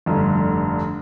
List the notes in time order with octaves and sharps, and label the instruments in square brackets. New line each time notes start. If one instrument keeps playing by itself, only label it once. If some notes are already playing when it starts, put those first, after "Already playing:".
[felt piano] F1 G2 D3